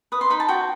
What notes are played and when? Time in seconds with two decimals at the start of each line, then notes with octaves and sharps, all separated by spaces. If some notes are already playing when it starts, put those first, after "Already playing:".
0.12 B4 D#6
0.21 C6
0.30 D#4 B5
0.40 A5
0.48 F#4 G5